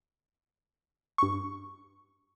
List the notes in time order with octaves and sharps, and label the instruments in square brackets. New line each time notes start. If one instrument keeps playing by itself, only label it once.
[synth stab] G2 C#6